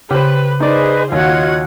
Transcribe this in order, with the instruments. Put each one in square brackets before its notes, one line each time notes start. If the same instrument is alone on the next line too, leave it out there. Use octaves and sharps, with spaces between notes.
[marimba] C#3 [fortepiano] G4 C5 [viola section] B4
[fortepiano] D#4 D5 [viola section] G#4 C5 [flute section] B4 D#5
[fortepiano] D#2 [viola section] F4 F#4 F#5 [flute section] C#5 D#5 G#6